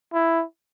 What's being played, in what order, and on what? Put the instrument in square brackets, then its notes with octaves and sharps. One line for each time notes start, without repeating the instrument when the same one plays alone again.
[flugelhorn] E4